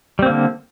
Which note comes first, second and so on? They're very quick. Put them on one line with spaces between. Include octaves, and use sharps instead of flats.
G3 C4 A#3 D3